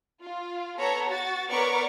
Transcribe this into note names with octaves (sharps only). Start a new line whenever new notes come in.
F4
B3 A4 C#5 A#5
F#4 A6
B3 A#4 C#5 D5 C#6 D6